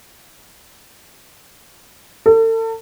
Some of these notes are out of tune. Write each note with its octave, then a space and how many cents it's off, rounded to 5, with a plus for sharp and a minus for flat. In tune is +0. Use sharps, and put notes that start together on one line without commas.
A4 +40